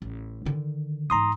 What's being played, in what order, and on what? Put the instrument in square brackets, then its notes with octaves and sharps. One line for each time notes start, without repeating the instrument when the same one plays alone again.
[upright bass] A1
D3 D#3
[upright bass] G#2 E3 [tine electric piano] A#5 C6 D#6